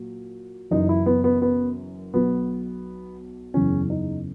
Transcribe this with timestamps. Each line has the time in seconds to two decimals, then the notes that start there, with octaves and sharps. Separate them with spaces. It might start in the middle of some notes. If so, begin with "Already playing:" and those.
Already playing: A#2 F#3
0.71 F#1 F#2 E3 D#4
0.89 E4
1.06 B3
1.24 B3
1.42 B3
2.14 B1 B2 F#3 B3
3.54 F#1 E2 C#3 C#4
3.90 D#4